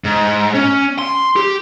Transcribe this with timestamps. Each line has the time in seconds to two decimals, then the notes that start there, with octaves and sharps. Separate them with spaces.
0.04 G#2
0.54 C#4
0.99 C6
1.36 G4